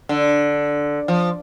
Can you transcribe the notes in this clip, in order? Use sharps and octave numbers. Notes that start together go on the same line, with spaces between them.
D3
F3